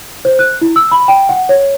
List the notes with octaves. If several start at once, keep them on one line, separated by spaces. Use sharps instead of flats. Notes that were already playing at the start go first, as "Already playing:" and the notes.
C5
F#6
E4
E6
B5
G5
F#5
C#5